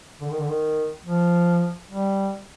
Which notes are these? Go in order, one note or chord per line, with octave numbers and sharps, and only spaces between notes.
D3
D#3
D3
D#3
F3
G3